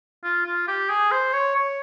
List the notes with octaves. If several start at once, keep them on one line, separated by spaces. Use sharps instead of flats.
F4
F4
G4
G#4
C5
C#5
C#5